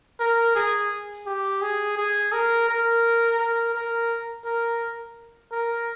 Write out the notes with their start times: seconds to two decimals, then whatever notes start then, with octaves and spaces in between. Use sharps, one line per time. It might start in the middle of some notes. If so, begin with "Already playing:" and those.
0.20 A#4
0.55 G#4
1.26 G4
1.61 G#4
1.97 G#4
2.33 A#4
2.69 A#4
3.39 A#4
3.75 A#4
4.45 A#4
5.52 A#4